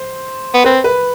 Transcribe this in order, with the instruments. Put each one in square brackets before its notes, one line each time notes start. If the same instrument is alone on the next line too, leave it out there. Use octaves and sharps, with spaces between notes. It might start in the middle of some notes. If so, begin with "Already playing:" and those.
Already playing: [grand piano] C5
[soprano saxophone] B3
[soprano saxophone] C4 [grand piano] B4
[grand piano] B4